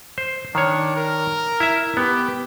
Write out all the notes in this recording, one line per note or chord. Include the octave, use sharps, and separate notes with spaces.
C5
D#3 D4 C#5
A#4
E4 E5
B3 G4